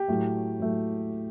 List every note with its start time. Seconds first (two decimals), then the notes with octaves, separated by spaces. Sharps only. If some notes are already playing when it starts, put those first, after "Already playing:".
Already playing: G4
0.08 A2 F#3 A3
0.60 A2 F#3 A3